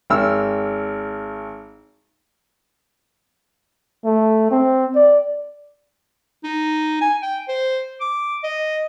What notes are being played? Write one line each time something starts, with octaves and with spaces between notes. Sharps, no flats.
G#1 E6 F6
A3
C4
D5
D#4
G#5
G5
C5
D6
D#5